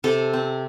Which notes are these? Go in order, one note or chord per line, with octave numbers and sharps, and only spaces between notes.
C3 A4
C4